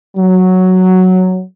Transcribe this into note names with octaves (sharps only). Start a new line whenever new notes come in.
F#3